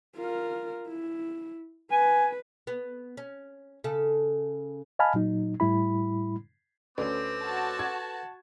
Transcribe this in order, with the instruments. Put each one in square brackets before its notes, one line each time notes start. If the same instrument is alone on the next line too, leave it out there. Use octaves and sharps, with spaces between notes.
[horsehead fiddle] F4 A#4
E4
[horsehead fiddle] B4 [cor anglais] G#5
[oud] B3
C#4
C#3 A4
[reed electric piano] D#5 F5 G#5 A5 B5 F6
A#2 F#3 D#4
A2 G3 E4 B5
[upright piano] D2 C#4 [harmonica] C4 D6 [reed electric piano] A4 B4
[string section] F#4 A5
[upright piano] G#6